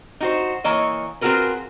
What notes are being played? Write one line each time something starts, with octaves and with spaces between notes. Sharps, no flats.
D#4 F#4 C5
E3 A#3 C#5 D#5
C4 F4 F#4 G#4 A#4 B4